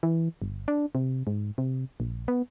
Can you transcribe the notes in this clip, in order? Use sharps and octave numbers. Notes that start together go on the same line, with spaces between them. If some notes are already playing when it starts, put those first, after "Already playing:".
E3
G1
D4
C3
G#2
C3
A#1
B3